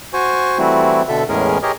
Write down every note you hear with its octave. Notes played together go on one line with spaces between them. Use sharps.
F#4 C5 G#5 C#6
E3 G3 A3 C4 E4 F#4
B2 D3 A4 E5
E2 A2 G#3 C#4 G#4 A#4
G4 G#4 A#4 C#5 D#5